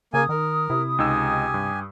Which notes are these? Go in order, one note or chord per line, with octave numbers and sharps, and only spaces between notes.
C#3 A#3 G#5 D#6
D#3 A#4
C3 E4
C#2 D#4 G4 G#5 E6
G2